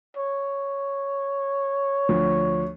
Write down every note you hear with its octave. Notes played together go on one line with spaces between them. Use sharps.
C#5
D2 F3